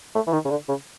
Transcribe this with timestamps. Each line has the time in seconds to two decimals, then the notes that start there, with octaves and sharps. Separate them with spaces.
0.15 A3
0.27 E3
0.33 D#3
0.45 C#3
0.50 D3
0.69 C#3